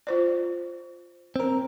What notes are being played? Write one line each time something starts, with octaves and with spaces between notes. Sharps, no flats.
F4 C5 D5
C4 A#4